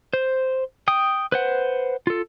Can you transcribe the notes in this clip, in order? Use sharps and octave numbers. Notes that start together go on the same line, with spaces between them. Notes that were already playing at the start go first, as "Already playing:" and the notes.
C5
G5 D#6
B4 C5 F#5
F4 A4